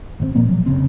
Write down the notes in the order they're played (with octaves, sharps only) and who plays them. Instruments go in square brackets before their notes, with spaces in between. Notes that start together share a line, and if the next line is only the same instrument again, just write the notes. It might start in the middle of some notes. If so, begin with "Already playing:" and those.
[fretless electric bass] G#1 C#3 C4
A#2 F3 A#3 C4
A#2 F3 F#3
F1 C2 C#3 C4